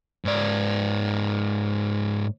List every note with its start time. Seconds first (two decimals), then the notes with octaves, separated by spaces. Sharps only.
0.25 G#2 D5